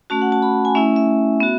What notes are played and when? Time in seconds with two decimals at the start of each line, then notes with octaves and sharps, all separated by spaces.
0.10 A3 C#4 F#4 A5
0.22 F#5
0.32 A5
0.42 B5
0.65 G#5
0.75 A3 C#4 E4 E5
0.96 E5
1.40 B3 F#4